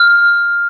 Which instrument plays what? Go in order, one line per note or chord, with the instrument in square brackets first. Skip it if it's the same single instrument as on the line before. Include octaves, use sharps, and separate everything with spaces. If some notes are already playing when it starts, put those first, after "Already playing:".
Already playing: [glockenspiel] F6